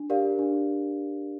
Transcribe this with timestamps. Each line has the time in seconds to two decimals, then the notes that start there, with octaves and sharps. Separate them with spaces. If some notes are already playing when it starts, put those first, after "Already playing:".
Already playing: D4
0.10 G4 A#4 D5 F5
0.39 D4